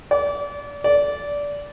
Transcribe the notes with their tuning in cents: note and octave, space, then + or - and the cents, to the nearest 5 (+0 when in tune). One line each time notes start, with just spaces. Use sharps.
D5 -35
D5 -20